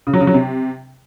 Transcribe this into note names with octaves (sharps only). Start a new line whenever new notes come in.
C#3
F#3
C#3
F#3
C3